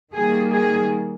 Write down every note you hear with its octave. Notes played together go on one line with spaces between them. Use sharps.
D#3 G3 A#3 G#4
G#4